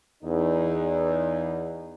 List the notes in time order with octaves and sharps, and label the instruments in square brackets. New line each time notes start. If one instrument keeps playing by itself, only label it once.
[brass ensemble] E2 D#4